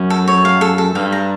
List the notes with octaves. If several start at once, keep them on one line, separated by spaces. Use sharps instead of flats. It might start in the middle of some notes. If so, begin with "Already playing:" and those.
Already playing: F#2
A4
C#5
F5
A4
A4
G2 F5
A#5